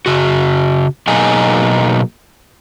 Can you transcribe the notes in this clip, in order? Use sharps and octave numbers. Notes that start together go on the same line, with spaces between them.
C#3 F#4
B2 F#3 A#3 D#4 G#4 G#5